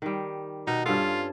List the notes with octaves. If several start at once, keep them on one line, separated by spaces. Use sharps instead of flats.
D#3 G3
B2 D#4
G2 C#4 F4 A4